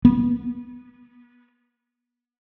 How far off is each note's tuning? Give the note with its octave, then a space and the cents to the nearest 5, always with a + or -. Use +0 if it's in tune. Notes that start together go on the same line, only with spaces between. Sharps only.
B3 -30